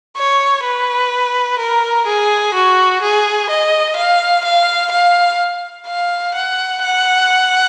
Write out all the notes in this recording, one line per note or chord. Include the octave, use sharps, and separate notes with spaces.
C#5
B4
A#4
G#4
F#4
G#4
D#5
F5
F5
F5
F5
F#5
F#5